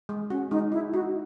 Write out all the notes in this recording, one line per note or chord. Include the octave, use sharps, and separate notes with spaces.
G#3
C#4 F#4
G#3 D#4
D#4 E4
D#4 F#4